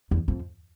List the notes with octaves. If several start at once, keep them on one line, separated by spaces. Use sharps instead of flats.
E2
F2